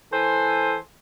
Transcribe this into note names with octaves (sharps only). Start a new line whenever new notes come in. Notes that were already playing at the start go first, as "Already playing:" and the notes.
E3 A4 C5 G#5